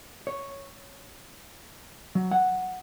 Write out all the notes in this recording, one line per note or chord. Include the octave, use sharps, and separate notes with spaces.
C#5
F#3
F#5